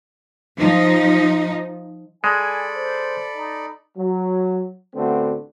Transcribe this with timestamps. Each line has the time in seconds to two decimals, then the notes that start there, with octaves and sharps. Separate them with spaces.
0.57 F3 D#4
2.24 G#3 A4 D5 G#5 B5
2.76 C5
3.35 D#4
3.98 F#3
4.95 A1 D3 A3 B3 C4 F#4